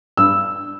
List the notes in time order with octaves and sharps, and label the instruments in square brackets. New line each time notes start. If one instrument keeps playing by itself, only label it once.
[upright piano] G2 E6